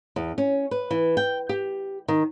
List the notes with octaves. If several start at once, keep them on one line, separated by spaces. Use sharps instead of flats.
E2
C#4
B4
E3
G5
G4
D#3